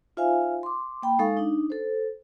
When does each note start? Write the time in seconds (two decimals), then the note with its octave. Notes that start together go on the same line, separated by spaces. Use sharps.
0.17 D#4 F4 C5 E5 F5 G#5
0.63 C6 D6
1.03 A#3 G5 B5
1.19 G#3 D#4 A4 F5 C#6
1.37 D4 D#4
1.70 A4 C5